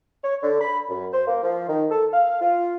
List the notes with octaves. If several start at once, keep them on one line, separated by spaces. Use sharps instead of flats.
C#5
D3
B5
F#2
C5
A#3
F3
D#3
A4
F5
F4